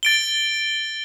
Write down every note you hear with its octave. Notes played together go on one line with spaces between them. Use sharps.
A6 D7 G7